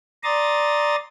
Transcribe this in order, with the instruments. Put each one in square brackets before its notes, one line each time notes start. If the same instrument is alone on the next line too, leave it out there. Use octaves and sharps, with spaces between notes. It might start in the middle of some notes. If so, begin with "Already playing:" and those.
[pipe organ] D5 A#5 C6 D#6 A6